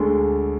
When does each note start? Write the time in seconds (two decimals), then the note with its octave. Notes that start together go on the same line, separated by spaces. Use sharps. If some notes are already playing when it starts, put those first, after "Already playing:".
Already playing: D2 D3 G#3